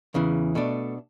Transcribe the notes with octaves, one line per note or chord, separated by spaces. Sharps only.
E2 C#3 E3
B2 A3 D4